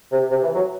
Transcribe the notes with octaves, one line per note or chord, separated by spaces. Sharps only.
C3
C3
E3
F#3